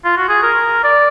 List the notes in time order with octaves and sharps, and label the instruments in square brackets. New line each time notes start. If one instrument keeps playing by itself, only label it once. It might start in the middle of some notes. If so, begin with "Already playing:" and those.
[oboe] F4
F#4
G#4
A#4
D5